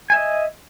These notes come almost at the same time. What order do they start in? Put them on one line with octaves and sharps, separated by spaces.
G#5 E5 D#5